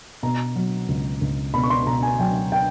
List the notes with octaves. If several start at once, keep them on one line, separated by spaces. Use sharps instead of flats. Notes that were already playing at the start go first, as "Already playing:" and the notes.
B2 A#5
F#3
C#2
C#2
B2 B5
C#6
C6
B2 A#5
G#5
F#3 G5
G5